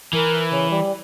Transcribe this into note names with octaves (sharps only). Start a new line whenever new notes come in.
E3 A#4
C#3
G3